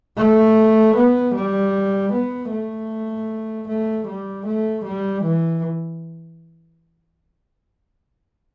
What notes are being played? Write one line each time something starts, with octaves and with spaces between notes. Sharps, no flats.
A3
B3
G3
B3
A3
A3
G3
A3
G3
E3